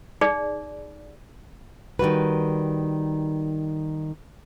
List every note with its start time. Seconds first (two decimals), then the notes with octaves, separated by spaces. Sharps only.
0.21 D#4 G#4 D5
1.99 D#3 G3 F#4 B4